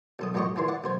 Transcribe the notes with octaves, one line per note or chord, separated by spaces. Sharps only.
B1 A4 D#6
A1 F2 F#3 G4 D#5 C#6
D#2 A#2 E3 C6
D5 F#5
B1 C5 G#5